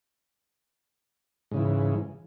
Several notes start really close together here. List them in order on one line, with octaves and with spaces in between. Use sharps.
G#2 C#3 E3